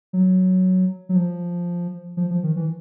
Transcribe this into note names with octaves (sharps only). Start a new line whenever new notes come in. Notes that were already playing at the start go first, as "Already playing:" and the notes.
F#3
F#3
F3
F3
F3
D#3
E3